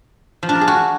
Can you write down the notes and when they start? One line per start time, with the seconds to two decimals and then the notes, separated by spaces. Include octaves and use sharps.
0.43 F3
0.49 D4
0.55 A#4
0.61 G#4
0.67 F#4